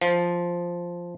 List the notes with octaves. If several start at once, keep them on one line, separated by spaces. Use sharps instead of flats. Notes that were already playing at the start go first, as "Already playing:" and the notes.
F3